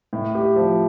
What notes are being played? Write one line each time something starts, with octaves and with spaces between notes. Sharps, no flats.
A2
G4
F3